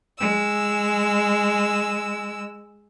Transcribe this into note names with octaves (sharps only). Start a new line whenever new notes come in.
G#3 E6